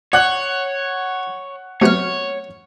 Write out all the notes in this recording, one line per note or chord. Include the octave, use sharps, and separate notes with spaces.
C#5 D5 F#5 F#6 F#7
C3 F#3 A3 B3 C#5 F6